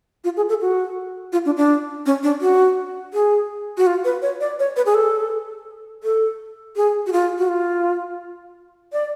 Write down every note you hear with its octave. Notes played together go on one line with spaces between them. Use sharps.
F4
G#4
A4
F#4
F4
D4
D4
C#4
D4
F#4
G#4
F#4
F4
B4
C#5
D5
C#5
B4
G#4
A4
A4
G#4
F#4
F4
F#4
F4
D5